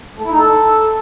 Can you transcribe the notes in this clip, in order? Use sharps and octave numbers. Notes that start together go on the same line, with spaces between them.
A3
E4
D#4
A4